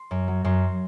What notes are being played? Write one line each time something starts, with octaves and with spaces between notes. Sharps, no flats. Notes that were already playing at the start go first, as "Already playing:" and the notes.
Already playing: C6
F#2
F#3
F#2 C6